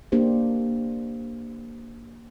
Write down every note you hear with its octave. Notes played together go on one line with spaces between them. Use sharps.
A#3 D4 G4 C5